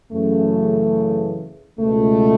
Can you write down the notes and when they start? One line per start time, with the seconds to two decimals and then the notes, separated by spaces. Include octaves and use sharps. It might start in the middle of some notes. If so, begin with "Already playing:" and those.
0.12 F#2 C#3 E3 A3
1.80 C#2 B2 A3